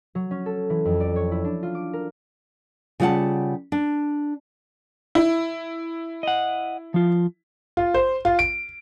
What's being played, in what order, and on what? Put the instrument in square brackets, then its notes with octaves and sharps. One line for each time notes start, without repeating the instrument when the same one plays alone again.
[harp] F#3
C#4
A4
E3
F2
D5
C#5
E4
D4
F4
D6
A#4
[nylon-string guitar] C#3 G3 F4 F#4 F#5 A5
D4
[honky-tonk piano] E4
[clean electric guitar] D#5 F#5
F3 F4
[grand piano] F4
C5
F4
D7